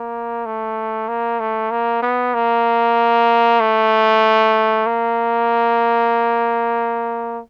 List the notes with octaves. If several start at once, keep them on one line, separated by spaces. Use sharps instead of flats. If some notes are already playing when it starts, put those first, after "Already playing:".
Already playing: A#3
A3
A#3
A3
A#3
B3
A#3
A3
A#3